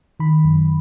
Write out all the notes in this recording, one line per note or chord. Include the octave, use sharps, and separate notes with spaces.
D#3 B5
F#2